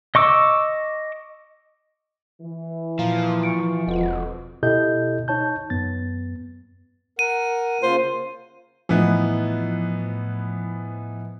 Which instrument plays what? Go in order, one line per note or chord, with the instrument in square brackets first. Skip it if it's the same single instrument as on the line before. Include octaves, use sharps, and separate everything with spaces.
[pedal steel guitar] D#5 C#6 D6 E6
[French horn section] E3
[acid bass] A#2 [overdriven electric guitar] F3 [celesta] F5 A#5
[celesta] C#6 C#7 D7
[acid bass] E1 [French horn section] F2 B2 [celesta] F4 D#5 F#5
[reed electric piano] B2 E4 G4 A4 D#5 G6
D#4 C#5 A5 G6
F#2 B3 A6
[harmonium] A#4 F#5 [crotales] D#7
[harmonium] C#3 A#3 F4 [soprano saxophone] C5
[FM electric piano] A2 F3 [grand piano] E3 B3 D#4